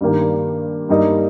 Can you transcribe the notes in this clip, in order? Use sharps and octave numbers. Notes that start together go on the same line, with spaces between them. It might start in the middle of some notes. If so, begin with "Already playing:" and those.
G2 D#3 A#3 G4
G2 G3 A#3 D#4